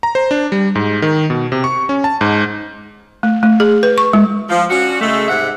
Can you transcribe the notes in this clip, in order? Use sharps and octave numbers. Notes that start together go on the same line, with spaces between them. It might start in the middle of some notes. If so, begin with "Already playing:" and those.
A#5
C5
D4
G3
G#2
D#3
B2
C3
C#6
C#4
A5
G#2
A3
A3
G#4
B4
C#6
G#3
F3
C#4 D4 F#4
C#3 G#3 A3
G#2 C3 E5 F#5